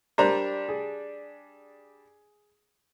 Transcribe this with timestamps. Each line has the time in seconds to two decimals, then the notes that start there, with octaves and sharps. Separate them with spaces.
0.18 G3 D4 A#4 C5 A#5
0.69 G#4